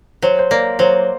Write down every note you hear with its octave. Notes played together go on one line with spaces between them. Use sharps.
F#3 C5
C5
A#3 D5
F#3 C5